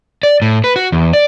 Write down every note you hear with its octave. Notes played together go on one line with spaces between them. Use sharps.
D5
A2
B4
F#4
E2
D5